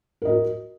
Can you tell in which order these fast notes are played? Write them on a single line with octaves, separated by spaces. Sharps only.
A#4 D#5 F#4